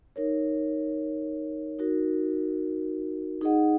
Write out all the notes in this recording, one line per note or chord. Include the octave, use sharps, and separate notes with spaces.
D#4 A#4 C#5
D#4 F#4 A#4
D#4 G#4 D#5 F#5